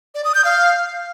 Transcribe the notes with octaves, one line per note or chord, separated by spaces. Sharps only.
D5
D#6
G6
F5